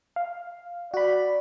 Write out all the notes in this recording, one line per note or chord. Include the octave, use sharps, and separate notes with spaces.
F5
F#4 D5 B5